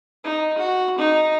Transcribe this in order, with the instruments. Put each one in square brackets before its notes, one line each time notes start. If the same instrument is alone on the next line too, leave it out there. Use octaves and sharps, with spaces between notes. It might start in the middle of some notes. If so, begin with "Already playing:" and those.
[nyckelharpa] D#4
F#4
D#4